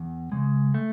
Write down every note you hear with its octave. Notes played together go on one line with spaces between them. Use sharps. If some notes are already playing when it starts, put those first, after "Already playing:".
Already playing: E2
C#3 G#3
A3